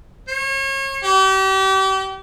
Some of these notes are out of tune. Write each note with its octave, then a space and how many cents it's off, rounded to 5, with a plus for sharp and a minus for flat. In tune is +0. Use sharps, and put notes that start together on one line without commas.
C#5 -35
G4 -35